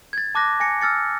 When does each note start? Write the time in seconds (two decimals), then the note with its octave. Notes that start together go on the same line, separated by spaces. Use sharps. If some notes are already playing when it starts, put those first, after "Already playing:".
0.13 G#6 A6
0.35 A5 D6 F#6 A#6
0.60 G#5 A#6 C#7
0.81 E6 F6 A6 C#7